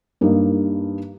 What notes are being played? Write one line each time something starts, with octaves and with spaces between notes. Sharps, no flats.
G2 A#3 D#4